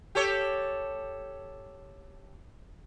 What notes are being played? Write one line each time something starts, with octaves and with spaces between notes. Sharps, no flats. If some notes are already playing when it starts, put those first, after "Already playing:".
G4 A4 C#5